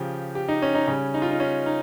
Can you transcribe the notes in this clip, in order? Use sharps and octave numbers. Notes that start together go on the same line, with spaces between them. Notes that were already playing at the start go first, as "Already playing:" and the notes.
Already playing: C#3 F3 G4
G4
D#4
C#4
D#4
C#3 G3 C#4
D#4
F4
D#4
C#4
D#4